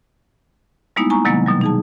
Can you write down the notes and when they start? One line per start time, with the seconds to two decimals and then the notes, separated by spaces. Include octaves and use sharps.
0.96 G3 G#3 A#3 B3 D#4 E4
1.10 G#5 A#5 C#6
1.25 C3 D#3 F#3 G#3 A#3 B3
1.46 B2 F#3 G3
1.61 D#4 G#4 A5